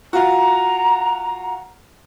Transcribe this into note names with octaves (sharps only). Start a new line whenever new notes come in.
F4 F#4 A#5